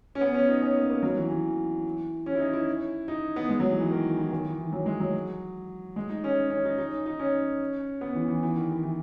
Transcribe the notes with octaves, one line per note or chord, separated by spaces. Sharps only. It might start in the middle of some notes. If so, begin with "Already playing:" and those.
C#4
B3
C#4
D#4
C#4
A#3
A#3
F#3
E3
E3
C#4
E4
D#4
E4
D#4
B3
G#3
F#3
E3
E3
D#3
E3
D#3
E3
E3
F#3
G#3
F#3
G#3
D#4
C#4
C#4
D#4
D#4
D#4
C#4
B3
E3
E3
E3
D#3
E3
E3